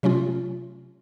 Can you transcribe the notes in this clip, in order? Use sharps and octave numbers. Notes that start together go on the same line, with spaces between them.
C3 F#3 A3 C#4 F4